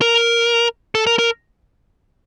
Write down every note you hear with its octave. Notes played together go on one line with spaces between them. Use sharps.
A#4
A4
A#4
A#4